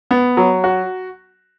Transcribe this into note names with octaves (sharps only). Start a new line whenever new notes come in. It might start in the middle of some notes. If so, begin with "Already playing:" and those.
B3
F#3
F#4